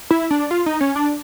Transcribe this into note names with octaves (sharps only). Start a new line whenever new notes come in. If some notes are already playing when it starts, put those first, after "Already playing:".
E4
D4
F4
D#4
C#4
D4